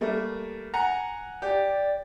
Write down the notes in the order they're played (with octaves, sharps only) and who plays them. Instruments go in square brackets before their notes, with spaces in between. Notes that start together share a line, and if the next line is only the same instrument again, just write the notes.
[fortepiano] G3 A3 A#3
F#5 G#5 A#5
[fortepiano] G4 [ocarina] D5